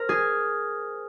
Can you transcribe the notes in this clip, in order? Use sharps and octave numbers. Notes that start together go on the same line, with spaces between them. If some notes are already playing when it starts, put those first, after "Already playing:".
Already playing: A#4 C5
G#4